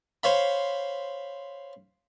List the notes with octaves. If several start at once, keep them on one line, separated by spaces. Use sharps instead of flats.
C5 C#5 F5 B5